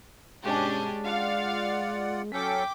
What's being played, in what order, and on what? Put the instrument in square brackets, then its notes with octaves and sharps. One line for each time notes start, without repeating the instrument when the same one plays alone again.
[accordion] G2 B2 G#5 [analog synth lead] G#3 [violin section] C#4 D4 G4
[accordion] F4 D5 F#5 [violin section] F5
[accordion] F#3 C#4 A4 [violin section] G5 D6 [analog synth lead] B6